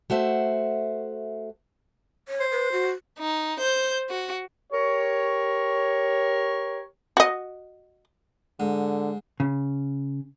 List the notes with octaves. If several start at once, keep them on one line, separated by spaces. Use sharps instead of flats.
A3 F#4 C5 E5
C#5
C5
B4
F#4
D#4
C5 G6
F#4
G4 A#4 C#5
F#4 D#5
G#2 D3
C#3